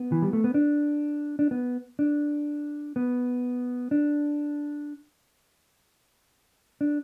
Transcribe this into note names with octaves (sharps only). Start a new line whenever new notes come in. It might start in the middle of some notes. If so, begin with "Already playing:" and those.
Already playing: B3
E3
G3
A3
B3
D4
D4
B3
D4
B3
D4
D4